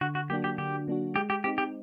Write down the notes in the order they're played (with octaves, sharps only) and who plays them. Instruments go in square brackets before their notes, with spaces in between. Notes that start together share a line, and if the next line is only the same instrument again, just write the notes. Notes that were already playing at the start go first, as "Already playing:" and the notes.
[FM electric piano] D3 [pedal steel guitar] F#4
[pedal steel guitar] F#4
[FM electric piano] F#3 A#3 D4 F#4 [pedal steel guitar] G4
[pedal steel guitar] G4
[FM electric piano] D3 [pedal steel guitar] G4
[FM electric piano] F#3 A#3 D4 F#4
[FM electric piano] G#3 [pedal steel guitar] G4
[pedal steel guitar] G4
[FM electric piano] C4 D#4 [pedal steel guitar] G4
[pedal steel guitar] G4